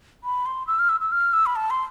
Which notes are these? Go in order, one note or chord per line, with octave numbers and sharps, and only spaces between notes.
B5
C6
E6
F6
E6
E6
F6
E6
B5
A5
C6